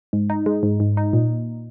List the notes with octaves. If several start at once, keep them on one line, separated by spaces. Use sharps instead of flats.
G#2
D#4
G#3
G#2
G#2
D#4
A#2